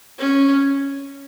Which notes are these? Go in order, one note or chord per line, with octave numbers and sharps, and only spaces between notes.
C#4